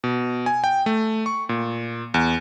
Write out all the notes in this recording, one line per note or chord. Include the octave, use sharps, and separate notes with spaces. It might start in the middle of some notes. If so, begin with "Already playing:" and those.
B2
G#5
G5
A3
C#6
A#2
E2